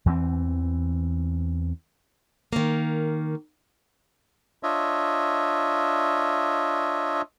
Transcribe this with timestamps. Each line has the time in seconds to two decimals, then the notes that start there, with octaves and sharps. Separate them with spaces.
0.06 E2 E3 A#3 C4
2.53 D#3 A#3
4.63 D4 F4 C#5 D#5 E5